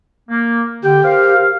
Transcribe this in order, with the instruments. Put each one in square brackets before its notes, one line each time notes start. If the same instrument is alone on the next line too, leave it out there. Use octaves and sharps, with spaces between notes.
[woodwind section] A#3
[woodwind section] D3 G5 [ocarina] G4
[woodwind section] A#4 C5 F5